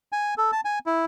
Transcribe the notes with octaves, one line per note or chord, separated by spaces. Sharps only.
G#5
A4
A5
G#5
E4